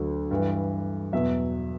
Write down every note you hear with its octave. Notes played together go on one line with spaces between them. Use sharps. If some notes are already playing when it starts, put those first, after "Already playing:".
Already playing: D2 D3 F#3
G2 E3
E2 B2 F#3 E5